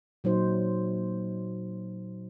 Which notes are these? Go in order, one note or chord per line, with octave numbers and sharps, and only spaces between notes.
A#2 F#3 D#4 C5